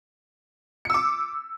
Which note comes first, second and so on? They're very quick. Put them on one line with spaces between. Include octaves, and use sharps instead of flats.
C#7 E6 D6